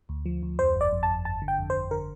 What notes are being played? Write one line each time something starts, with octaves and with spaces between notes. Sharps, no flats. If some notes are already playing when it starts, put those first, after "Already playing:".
D2
F3
D2
F2 C5
G1
D5
F2
A5
G1
G1 A5
D3
G5
F2
C5
G1
D3 A#4